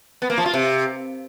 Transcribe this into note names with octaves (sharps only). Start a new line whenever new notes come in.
B3
A#3
F3
F4
C3